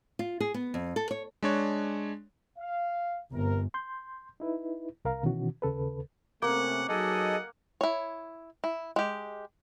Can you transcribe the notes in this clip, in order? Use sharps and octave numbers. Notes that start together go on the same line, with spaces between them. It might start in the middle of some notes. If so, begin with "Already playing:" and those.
F4
G#4
B3
F2
A4
C#5
G#3 D4 C#5
F5
G1 C3 A#4
C6 G6
D#4 E4 B4
C2 A#4 F5 A#5
B2 D#3 E3 C#4 F#4
D#2 C#3 A4 B4
C3 A3 A#3 C#4 F#5
F#3 D#4 G#4 A4 D#5 F#5
E4 C#5
E4
G#3 G4